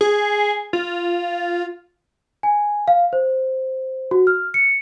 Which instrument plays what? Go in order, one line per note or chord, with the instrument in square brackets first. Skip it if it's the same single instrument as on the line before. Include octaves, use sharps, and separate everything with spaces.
[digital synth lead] G#4
F4
[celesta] G#5
F5
C5
F#4
F6
C#7